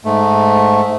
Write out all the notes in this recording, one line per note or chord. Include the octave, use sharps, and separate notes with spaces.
G#2 A3